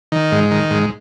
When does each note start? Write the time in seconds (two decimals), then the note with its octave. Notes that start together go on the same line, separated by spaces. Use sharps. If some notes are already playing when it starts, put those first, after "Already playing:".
0.12 D#3
0.32 G#2
0.51 D#3
0.71 G#2